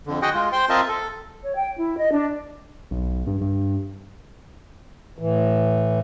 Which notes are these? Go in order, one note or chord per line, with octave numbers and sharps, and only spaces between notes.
F2 D3
F#4 G#4 D#5 F#5 G5
G#3 F4
C5 G5 C6
C4 F4 A#4 D#5 E5 A5
A4
C#5
G5
E4
D#5
D4
B1
G2
G2
A2 E3